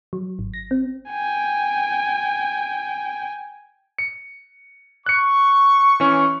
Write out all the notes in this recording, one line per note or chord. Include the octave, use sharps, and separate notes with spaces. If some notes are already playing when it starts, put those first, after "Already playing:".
F#3
G#1
A#6
C4
G5 G#5
C#7
C#6 F#6 C#7
E3 C#4